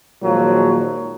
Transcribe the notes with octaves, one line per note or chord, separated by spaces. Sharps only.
A#2 D#3 F3 F#3 G#3 A#3